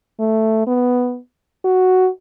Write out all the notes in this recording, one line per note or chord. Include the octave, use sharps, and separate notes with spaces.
A3
B3
F#4